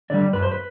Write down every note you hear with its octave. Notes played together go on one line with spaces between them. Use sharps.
D3 G3 D5
F#2 B4
C5
B4